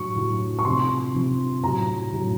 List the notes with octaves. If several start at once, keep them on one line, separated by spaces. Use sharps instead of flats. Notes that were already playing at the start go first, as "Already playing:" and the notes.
Already playing: A2 F#3 C#6
A2 F#3
C#6
C3 F3 C6
C3 F3
A2 F#3 A#5
A2 F#3